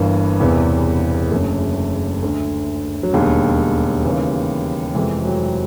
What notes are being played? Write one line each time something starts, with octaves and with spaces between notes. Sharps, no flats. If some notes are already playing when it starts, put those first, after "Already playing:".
Already playing: G1 G2 E3 A#3
E1 E2 C3 E3
F#1 F#2 D3 A3
D2 D3
F#3
E1 D#2 D3 G3
D#2 C#3 E3
F1 F2 C3 E3 G#3
F#3